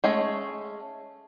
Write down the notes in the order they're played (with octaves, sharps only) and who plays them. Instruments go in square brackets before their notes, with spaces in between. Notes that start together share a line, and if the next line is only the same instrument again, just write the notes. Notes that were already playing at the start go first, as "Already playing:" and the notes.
[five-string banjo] G#3 A3 C#4